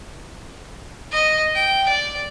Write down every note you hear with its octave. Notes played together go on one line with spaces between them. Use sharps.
D#5
G5
D5